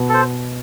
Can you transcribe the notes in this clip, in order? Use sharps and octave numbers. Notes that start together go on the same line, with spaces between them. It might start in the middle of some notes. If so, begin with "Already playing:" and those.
Already playing: B2
A4 C5